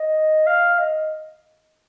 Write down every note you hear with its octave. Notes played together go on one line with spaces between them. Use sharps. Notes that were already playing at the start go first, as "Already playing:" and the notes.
Already playing: D#5
F5
D#5